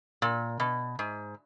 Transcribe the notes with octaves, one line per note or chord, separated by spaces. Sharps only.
A#2
B2
G#2